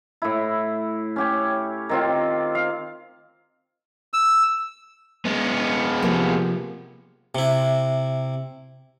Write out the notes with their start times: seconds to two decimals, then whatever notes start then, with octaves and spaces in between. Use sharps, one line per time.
0.22 A2 E4
1.16 C#4 G4 C#5
1.89 D#3 C4 F4
2.55 F5
4.13 E6
5.25 G#3 B3
6.02 C3 F3 A#3
7.35 C3 E4